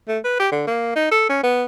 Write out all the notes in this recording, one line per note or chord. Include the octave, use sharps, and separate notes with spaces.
A3
B4
G4
D3
A#3
D#4
A4
C#4
B3